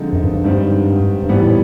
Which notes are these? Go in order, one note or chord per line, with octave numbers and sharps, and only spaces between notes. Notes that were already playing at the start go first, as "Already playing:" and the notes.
Already playing: D3 F3 G#3 C4 D#4
F#2
G2
G2
G#2 D#3 G3 C4
G2
G#2 E3 G3 B3
A2